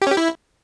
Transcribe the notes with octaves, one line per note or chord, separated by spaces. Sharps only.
G4
C#4
G4
E4